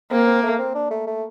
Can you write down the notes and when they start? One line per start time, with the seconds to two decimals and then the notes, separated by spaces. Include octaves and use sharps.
0.11 A#3 C4
0.27 C4
0.43 A3
0.59 C4
0.75 D4
0.91 A3
1.07 A3